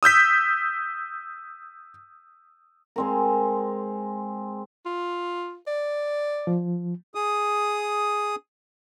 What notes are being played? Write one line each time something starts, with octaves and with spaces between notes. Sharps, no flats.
D#6 E6 G6 B6
G#3 C4 A#4
F4
D5
F3
G#4 D#6